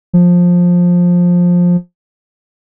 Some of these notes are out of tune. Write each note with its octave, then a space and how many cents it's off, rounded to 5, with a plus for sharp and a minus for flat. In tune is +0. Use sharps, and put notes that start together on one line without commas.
F3 +15